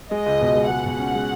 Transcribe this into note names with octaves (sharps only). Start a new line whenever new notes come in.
G#3 D#5
C#2
B2
G#3
G#3 F#5
B2
C#4
G#3